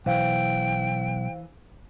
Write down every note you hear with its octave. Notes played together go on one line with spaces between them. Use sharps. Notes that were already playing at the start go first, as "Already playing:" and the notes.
B1 E3 C5 F5 G5